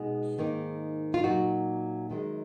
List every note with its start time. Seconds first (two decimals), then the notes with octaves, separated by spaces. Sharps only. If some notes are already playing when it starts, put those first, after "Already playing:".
Already playing: B2 G#3 B3 D#4 G#4
0.38 G#2 D#3 A#3 D#4
1.14 F4
1.23 A#2 F#3 A#3 D#4 F#4
2.10 F#2 D#3 G#3